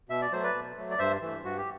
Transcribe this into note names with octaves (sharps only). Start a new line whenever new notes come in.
B2 E5
D5
F#3 A3 C5
B4 D5
B2
F#3 A3
D5
G2 C5 E5
E3 A3
G2 F#4
G4